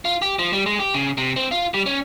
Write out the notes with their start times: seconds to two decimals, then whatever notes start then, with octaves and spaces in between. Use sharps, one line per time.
0.05 F4
0.22 G4
0.39 F3
0.53 G3
0.66 G#3
0.79 G4
0.94 C#3
1.18 C3
1.36 C4
1.51 F4
1.74 G3
1.86 C#4